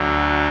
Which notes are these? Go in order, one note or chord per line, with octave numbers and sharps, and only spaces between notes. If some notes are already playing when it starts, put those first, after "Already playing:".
Already playing: D2 D3 F#3